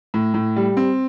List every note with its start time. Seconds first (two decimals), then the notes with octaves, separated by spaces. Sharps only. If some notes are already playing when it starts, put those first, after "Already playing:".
0.14 A2
0.34 A2
0.56 G3
0.77 C4